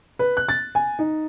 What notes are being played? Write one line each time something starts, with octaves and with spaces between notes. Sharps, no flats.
B4
F#6
A6
G#5
D#4